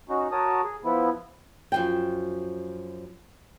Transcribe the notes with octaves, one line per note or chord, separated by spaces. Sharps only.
C#4 D#4 F#4
F#4 A#4 C#5 A5 D#6
G#4
F3 B3 E4
F#2 F3 G5